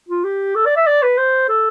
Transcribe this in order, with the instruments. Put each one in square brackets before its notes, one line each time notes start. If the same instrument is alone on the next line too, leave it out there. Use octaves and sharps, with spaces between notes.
[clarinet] F4
G4
A4
D5
E5
D5
B4
C5
A4